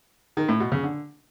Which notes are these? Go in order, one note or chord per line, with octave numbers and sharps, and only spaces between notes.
D#3
A2
B2
C#3
D3